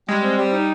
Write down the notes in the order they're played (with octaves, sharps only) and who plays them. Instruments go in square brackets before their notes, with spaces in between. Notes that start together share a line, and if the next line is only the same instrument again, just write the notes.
[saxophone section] G3 [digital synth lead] G#3
[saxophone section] C4
G3
D#4